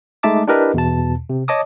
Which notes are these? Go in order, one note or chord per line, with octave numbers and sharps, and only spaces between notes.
G#3 A3 D#4 E5 A5 D6
D4 E4 G4 A#4 B4 D#5
E2 B2 A5
C3
C#5 D#5 A5 D6 D#6